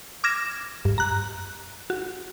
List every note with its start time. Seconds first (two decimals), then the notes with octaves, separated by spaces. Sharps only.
0.24 D6 F6 G#6 A#6 E7
0.85 G2
0.98 A#5 F#6
1.90 F#4